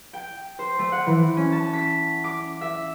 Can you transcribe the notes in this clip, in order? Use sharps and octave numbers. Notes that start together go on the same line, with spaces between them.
G5
C5
A3
F#5
E3
C#4
A5
B6
D6
E5